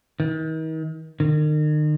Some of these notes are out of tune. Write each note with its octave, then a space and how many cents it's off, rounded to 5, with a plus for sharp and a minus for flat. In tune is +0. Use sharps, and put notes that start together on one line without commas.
D#3 +40
D#3 -40